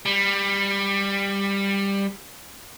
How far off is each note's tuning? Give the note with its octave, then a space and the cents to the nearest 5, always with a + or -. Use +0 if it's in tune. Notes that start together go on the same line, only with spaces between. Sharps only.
G3 +15